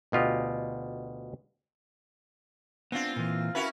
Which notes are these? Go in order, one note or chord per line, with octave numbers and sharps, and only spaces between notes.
D2 B2 F4 G4 D#5
B3 C4 D4 F4
A#2 E3
C#4 E4 F#4 A#4 B4